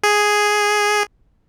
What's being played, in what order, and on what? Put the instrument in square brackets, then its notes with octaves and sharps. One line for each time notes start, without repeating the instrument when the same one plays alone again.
[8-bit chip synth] G#4